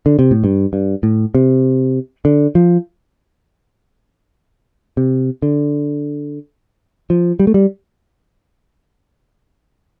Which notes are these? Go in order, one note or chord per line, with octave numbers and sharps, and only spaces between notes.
D3
C3
A2
G2
G2
A2
C3
D3
F3
C3
D3
F3
G3
A3
G3